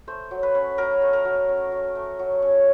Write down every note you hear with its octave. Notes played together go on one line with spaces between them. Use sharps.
A3 C5
F#3
B4
C#4
F#3 A#4
A3
A#4
F#3
C#4
F#3
A3
F#3
C#4